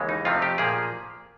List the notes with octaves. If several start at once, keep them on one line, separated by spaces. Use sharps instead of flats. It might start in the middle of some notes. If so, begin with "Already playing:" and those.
Already playing: D#2 C#3 E3 G#3
D#4
F2 C3 F3 A3 C4 F4
G4
A#2 F3 A#3 G#4